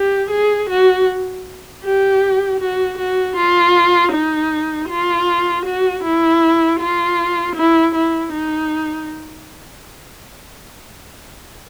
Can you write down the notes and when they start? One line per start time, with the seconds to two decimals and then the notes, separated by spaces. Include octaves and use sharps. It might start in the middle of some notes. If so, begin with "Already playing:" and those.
Already playing: G4
0.31 G#4
0.69 F#4
1.84 G4
2.60 F#4
2.99 F#4
3.36 F4
4.13 D#4
4.90 F4
5.66 F#4
6.04 E4
6.80 F4
7.56 E4
7.95 E4
8.34 D#4